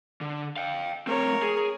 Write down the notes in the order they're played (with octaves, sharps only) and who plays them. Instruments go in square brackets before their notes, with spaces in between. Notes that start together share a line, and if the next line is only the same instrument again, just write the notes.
[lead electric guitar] D3
F5 G5
[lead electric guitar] A3 C4 [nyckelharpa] A#4 C#5
[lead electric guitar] G#4